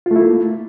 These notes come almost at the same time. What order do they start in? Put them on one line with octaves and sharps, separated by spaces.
F4 A3 E4 A#3